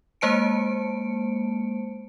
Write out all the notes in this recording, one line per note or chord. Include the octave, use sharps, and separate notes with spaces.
G#3 A#3 C5 A5 C#7 D7